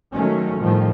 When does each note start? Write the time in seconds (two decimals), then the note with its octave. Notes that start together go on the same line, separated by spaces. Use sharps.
0.13 D#3 F#3 G#3 A3 C#4
0.57 A2 D#3 F3 G3